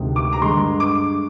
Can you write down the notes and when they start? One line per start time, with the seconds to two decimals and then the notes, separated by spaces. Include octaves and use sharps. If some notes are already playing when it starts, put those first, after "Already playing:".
Already playing: D2 C3 D#3 G#3 C4
0.16 D6
0.33 A#5
0.41 G2 D3 G#3 C6
0.80 D6